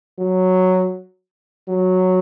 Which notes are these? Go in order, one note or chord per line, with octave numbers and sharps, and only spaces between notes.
F#3
F#3